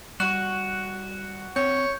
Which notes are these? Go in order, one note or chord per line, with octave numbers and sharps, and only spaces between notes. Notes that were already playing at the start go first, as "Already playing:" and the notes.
G3 F#4 F#6
C4 C#5 G6